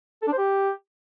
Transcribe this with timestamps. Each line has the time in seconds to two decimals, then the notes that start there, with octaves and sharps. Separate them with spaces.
0.22 A4
0.27 D4
0.32 C5
0.38 G4